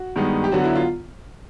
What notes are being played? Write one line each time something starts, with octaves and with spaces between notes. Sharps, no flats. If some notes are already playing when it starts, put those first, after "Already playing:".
Already playing: F#4
G2 D#3 G#3 B3 D#4
G4
D3 F#3 B3 F#4
E4
F4